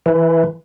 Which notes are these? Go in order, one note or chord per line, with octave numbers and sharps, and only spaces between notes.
E3